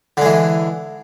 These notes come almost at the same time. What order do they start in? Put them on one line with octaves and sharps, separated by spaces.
D3 G#3 E3